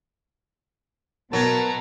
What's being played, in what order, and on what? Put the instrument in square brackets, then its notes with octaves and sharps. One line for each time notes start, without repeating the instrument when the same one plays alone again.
[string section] B2 [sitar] F#3 [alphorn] A#4 [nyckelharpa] A5 A#5